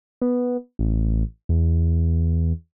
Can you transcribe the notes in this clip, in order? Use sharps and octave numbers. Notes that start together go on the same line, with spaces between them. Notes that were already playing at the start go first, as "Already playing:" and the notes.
B3
A1
E2